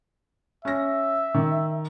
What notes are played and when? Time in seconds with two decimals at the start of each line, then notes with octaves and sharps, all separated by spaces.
0.65 C#4 E5 A#6
1.35 D#3